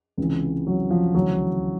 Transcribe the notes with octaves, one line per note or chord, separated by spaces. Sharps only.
C#2 C3 E3
F#3
F3
D2 C#3 E3 F#3